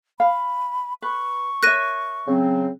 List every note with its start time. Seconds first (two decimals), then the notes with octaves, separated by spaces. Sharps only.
0.20 F5 B5
1.02 B4 C#6
1.63 A#4 C#5 E5 F#6 A#6 D#7
2.28 C#3 F#3 C4